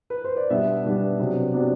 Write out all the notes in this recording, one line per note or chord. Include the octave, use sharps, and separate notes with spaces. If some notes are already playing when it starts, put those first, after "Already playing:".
B4
C5
D5
B2 G3 B3 D4 E5
B2 G3 B3 D4
C3 F#3 B3 D4
C3 F#3 B3 D4